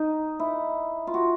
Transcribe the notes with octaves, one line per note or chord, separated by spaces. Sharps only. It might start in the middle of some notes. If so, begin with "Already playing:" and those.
Already playing: D#4
E4
F4
F#4